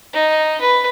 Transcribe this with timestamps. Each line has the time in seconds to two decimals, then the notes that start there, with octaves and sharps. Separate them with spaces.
0.13 D#4
0.60 B4